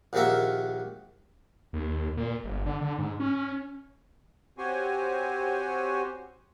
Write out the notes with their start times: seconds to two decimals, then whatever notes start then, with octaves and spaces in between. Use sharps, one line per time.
0.13 A#1 D#2 D#3 A#3 F#4 E5
1.73 D#2
2.17 A#2
2.44 G1
2.66 D3
2.81 D3
2.98 G#2
3.20 C#4
4.58 C4 F#4 G4 C5 C#5 G#5